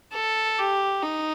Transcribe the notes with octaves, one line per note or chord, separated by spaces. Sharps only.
A4
G4
D#4